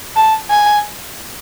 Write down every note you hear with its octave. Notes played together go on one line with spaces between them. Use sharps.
A5
G#5